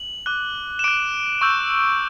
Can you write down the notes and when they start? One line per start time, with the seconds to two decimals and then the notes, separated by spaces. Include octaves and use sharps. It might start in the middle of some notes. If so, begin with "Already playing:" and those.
Already playing: F#7
0.26 D6 F#6
0.79 E7
0.84 D6 F#6 D7
1.41 C#6 E6 G6